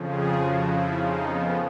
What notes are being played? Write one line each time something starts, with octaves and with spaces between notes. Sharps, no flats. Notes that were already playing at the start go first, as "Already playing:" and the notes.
Already playing: F2 C#3 F3
G#4
F#4
E4
D#4
B3